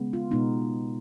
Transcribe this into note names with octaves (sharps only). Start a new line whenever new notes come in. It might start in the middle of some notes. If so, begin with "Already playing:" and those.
Already playing: C#3 G#3 B3
F4
B2 G#3 B3 D#4